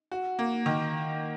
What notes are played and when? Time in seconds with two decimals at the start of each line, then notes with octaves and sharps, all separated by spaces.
0.12 F#4
0.39 A#3
0.66 D#3